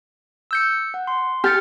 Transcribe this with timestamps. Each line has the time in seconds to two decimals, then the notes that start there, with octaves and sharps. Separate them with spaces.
0.51 E6 G6 C#7
0.94 F#5
1.07 C6
1.44 G4 F6 A6 C#7